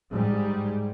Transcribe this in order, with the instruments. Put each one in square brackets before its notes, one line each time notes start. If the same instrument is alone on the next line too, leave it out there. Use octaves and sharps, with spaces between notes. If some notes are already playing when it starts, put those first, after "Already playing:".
[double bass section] G#2 G3